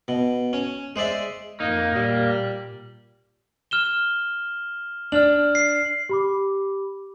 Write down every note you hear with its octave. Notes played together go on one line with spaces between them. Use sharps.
B2
C#4
G#3 C5 D5 E5
F2 A#3 D#4
A#2 G3
F6 E7 G7
D4 F6 F#7
C7
G4 B5 D6